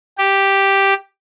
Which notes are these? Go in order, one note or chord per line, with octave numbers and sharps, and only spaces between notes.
G4